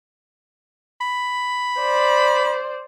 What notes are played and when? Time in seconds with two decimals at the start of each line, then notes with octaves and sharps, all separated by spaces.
1.00 B5
1.80 C5 D5